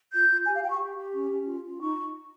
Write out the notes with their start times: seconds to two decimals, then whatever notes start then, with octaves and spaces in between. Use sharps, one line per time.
0.13 F4 G6
0.30 F4
0.46 G4 G#5
0.55 F5
0.63 G4 G5
0.71 C#6
0.80 G4
0.97 G4
1.14 C#4
1.31 C#4
1.46 F4
1.63 F4
1.80 D#4 C#6